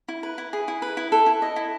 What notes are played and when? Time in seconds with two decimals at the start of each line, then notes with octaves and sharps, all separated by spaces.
0.08 E4
0.23 B4
0.38 E4
0.53 G#4
0.68 E4
0.82 B4
0.97 E4
1.12 A4
1.26 E4
1.42 D#5
1.56 E4